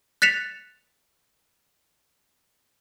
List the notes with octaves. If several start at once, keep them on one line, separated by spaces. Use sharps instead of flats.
F#6 A6 B6 C#7 E7 F7